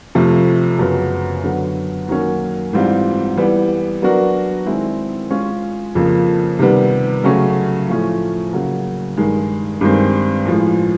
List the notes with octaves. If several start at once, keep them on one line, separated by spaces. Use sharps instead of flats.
F2 C3 F3 A3
F#2 C#3 F#3 B3
D3 F#3 B3
D#3 F#3 A#3 C#4
G#2 E3 G3 C4 F4
E3 G3 B3
F#3 B3 D4 F#4 A#4
D#3 G#3 C4 E4
G#3 C#4 F4
F2 C#3 F3 A#3
C3 D#3 G3 B3
C#3 F#3 A3 C#4
A2 F3 A3 C#4
C#3 F#3 A#3
G2 D#3 G#3
G2 D#3 G#3 C4
A2 F3 G#3